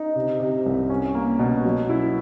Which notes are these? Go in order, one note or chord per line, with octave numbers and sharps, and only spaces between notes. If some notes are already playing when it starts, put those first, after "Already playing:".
Already playing: D#4
C3
C3
C2
C#4
A#3
B2
F#3
E4